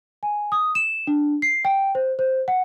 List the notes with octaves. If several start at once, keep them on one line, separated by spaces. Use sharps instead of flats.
G#5
D#6
E7
D4
C7
G5
C5
C5
F#5